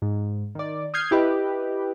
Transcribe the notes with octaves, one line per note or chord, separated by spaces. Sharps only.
G#2
D#3 D5
D#6 F6 G6 G#6 C7
E4 G4 B4 D#5